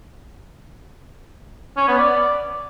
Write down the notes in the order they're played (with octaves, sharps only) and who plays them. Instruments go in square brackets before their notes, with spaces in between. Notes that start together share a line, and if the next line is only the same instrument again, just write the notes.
[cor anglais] C#4
B3
D5